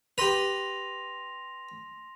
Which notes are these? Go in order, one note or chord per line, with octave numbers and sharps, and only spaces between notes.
G4 B4 C6 A#6 F7